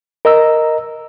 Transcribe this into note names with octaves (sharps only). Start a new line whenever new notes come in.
A#4 D#5 A#5 E6